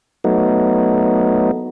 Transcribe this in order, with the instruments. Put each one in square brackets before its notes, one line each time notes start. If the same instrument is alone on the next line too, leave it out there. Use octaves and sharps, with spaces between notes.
[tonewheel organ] F#3 A3 B3 D#4